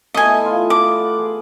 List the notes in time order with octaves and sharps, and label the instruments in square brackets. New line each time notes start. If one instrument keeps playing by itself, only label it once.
[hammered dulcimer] A3 B3 E4 [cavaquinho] D#5 G#5
[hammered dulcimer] F4
[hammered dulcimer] A4 [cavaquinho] D6
[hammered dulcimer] F#5
G#4